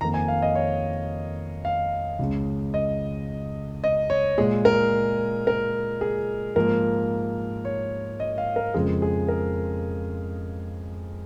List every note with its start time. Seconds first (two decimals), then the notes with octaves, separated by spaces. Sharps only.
0.01 F2 D#3 A#3 A#5
0.14 G#5
0.28 F5
0.42 D#5
0.55 C#5
1.65 F5
2.19 C#2 C#3 G#3
2.74 D#5
3.84 D#5
4.10 C#5
4.38 A#2 G#3 G#4
4.65 A#4
5.47 A#4
6.01 G#4
6.56 G#2 F3 A#3 A#4
7.65 C#5
8.20 D#5
8.38 F5
8.56 A#4
8.74 F2 C#3 F3 G#3 G#4
9.02 G#4
9.28 A#4